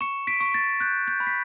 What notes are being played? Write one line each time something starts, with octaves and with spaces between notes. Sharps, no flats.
C#6 C#7 E7
B6 D7
C#6
A6
F#6 G6
G6
B5
B6